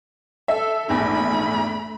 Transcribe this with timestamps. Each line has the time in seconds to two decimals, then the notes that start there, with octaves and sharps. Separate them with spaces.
0.48 A4 E5
0.89 A#1 E2 G#2 A3 B5